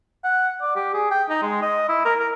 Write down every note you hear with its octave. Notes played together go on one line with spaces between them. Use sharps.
F#5
D5
G4
G#4
G5
D#4
G#3
D#5
E4
A#4
A#4